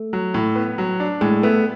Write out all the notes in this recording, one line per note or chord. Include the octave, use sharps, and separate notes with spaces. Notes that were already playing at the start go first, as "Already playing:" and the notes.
Already playing: A3
F#3
A2
B3
F#3
D4
A2 G#3
A3 B3